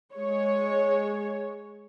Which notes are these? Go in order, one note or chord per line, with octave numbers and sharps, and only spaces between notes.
G#3 C#5